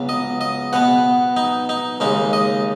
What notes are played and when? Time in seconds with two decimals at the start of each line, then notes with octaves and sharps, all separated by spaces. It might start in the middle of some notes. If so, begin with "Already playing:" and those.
Already playing: C#2 C#3 F#3 B3
0.09 D#5
0.41 D#5
0.73 B2 B3 F#5
1.37 D#4
1.69 D#4
2.00 D#2 C#3 G#3 D#4
2.33 D#5